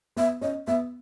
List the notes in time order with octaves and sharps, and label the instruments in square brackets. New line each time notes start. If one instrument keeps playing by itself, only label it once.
[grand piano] B3 [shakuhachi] E5
[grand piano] C#4 [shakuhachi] D#5
[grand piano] B3 [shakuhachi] E5